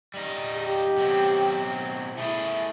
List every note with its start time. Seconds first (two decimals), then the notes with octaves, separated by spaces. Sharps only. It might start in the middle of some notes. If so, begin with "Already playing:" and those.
0.14 G3 D#4
0.56 G4
0.97 B2 F#3 C4
2.18 A3 E4 G#4